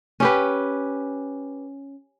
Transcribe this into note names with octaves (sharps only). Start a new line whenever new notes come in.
C#4 G4 B4